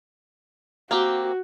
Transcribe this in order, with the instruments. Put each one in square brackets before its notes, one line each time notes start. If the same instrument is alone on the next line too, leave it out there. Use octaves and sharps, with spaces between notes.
[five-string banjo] A#3 C4 G4 [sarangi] F#4